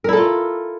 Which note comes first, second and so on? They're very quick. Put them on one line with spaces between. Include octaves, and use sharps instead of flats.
A#4 E4 A4 F4